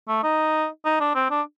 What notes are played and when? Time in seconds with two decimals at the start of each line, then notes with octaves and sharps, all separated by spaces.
0.08 A3
0.23 D#4
0.85 D#4
1.01 D4
1.15 C4
1.31 D4